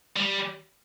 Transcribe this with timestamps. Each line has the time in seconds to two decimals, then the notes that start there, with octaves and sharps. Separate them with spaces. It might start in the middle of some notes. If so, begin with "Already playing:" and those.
0.17 G3